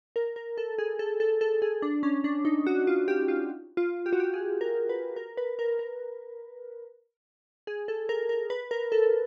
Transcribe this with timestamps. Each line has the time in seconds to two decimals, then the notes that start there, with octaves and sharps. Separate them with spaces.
0.16 A#4
0.36 A#4
0.58 A4
0.78 G#4
0.99 A4
1.20 A4
1.41 A4
1.62 G#4
1.82 D4
2.03 C#4
2.24 D4
2.45 D#4
2.67 F#4
2.87 F4
3.08 G4
3.28 F4
3.77 F4
4.06 G4
4.13 F#4
4.20 G4
4.34 G#4
4.61 A#4
4.89 B4
5.16 A#4
5.37 B4
5.59 A#4
5.79 A#4
7.67 G#4
7.88 A4
8.09 A#4
8.29 A#4
8.50 B4
8.71 A#4
8.92 A4